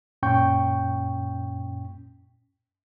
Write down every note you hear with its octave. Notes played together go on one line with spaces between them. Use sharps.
F#2 A#2 C#4 G5 C#6 G6